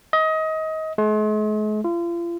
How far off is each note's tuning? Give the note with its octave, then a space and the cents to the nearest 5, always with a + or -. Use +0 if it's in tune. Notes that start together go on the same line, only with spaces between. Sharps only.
D#5 +25
G#3 +45
F4 -40